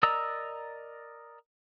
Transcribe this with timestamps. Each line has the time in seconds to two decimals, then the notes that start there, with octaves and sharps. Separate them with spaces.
0.03 A#4 D5 D#5 A#5 E6